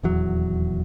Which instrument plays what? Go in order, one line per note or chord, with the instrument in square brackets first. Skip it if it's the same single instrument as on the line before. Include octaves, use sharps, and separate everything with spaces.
[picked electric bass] D#1 E2 F#3